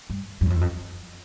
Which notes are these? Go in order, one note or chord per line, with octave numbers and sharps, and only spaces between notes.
G2
F#2
E2
F2
E2
F2